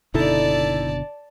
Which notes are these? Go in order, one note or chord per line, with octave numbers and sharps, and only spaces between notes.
F#1 B2 D3 D#4 E4 A4 D5 A5